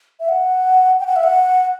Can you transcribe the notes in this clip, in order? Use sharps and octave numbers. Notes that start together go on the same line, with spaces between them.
E5
F#5
G5
F#5
E5
F#5